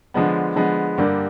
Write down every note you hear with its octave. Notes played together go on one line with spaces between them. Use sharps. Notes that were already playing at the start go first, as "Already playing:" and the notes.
D3 F3 G#3 B3
D3 F3 G#3 B3
G2 D3 G3 A#3